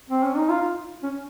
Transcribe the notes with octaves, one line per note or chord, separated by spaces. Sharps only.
C4
C#4
D#4
F4
C#4